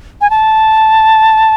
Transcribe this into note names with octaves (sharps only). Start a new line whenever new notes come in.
G#5
A5